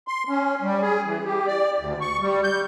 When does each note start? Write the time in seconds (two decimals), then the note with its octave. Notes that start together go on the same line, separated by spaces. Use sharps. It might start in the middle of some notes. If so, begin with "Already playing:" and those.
0.08 C6
0.29 C#4
0.62 G3
0.82 G#4
1.05 E3
1.25 G4
1.47 D5
1.78 D2
2.01 C#6
2.20 G3
2.43 G6